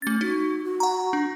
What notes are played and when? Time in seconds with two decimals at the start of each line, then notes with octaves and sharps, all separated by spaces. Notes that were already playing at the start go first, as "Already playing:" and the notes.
0.02 A3 C#4 A6
0.21 D#4 F#4
0.65 F#4
0.80 F#5 A#5
1.13 D4